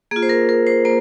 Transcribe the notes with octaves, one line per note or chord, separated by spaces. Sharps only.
A#3 F4 G#4
C5
A#4
A#4
C5
A#3 C5